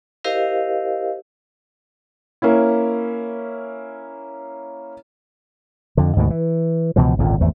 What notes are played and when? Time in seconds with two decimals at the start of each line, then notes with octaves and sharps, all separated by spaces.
0.24 E4 G4 A#4 C5 D#5 F5
2.42 A#3 C#4 E4
5.97 F2 D3
6.17 D2 G#2 B2 D#3
6.30 E3
6.96 C#2 B2 E3 F3
7.19 G#1 C#2 A#2 D3
7.40 G#1 E2 A3